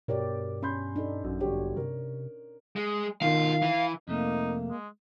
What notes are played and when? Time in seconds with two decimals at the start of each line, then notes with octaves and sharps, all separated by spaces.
0.08 G2 B2 G4 A#4 C#5 D5
0.63 C#4 B5 C6 G6
0.96 D4 D#4 A4
1.24 A1 F#2
1.40 G1 F#3 D4 G4 C#5
1.77 C3 A#4
2.76 G#3
3.22 B2 D#3 F4 F5
3.62 E3
4.08 F2 C3 A3 A#3 D#4
4.70 G#3